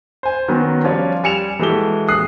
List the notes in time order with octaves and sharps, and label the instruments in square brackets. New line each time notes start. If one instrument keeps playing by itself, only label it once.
[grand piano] C5 G#5
D#3 F#3 B3 C#4
F3 G3 C#4 F4 C#5 D5
G3 G#5 C#7 E7 F7
E3 G#3 F#4 G4 A4 G7
A#1 D#6 F#6 C7